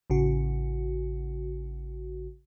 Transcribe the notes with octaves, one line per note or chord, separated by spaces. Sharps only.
A1 C#3 F#4